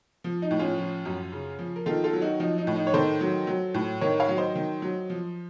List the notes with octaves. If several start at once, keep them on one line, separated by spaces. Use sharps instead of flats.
F3
D#4
A2
C#4 F4
F3
F#2
C#3
F3
A#4
D#3 F4 A4
F4 A4
F#3
D#4 F#4
F3 D#4
D#4
A2
D#4
C#5
D#3 A4 C5
F#3
F#3
A2
D#3 A#4 C#5
C#5 F5
F#3
C5 D#5
D#3
F#3
F3